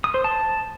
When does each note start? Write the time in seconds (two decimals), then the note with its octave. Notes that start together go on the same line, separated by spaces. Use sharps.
0.04 D#6
0.14 C5
0.24 A5